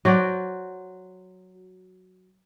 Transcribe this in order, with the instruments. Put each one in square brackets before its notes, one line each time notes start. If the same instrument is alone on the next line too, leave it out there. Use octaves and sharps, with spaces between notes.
[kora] F#3 F#4 C5 D5